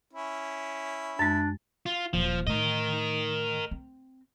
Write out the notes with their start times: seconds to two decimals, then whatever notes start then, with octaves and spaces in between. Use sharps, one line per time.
0.13 C#4 E4
1.19 F#2 G#3 D4 A6
1.86 F4
2.14 D#1 F3
2.47 A2 A#4 D#5
3.71 C4